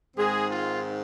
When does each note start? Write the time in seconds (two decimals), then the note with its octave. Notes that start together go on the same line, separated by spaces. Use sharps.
0.17 G#2 D#3 G#3 C4 G#4
0.49 F4